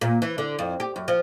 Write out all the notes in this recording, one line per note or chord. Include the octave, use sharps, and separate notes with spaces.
A#2
E3
D3
F2
G4
F#2
F3